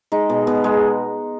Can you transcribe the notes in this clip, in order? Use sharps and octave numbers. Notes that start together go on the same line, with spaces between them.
G#3 D#4
B2
B2
G#3